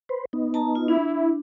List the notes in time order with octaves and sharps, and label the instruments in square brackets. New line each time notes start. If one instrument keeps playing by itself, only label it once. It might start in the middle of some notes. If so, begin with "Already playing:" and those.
[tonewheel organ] B4 C5
B3 D#4
[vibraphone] A5 A#5
F4
[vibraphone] D4 [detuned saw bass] E4